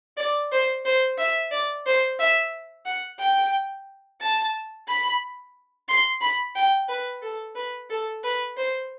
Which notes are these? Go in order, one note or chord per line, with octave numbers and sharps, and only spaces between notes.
D5
C5
C5
E5
D5
C5
E5
F#5
G5
A5
B5
C6
B5
G5
B4
A4
B4
A4
B4
C5